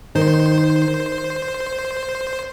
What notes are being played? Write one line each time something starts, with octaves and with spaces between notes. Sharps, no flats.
D#3 C5